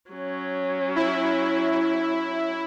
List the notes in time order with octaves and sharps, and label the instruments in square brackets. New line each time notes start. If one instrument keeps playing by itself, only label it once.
[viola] F#3 C#4
[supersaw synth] E4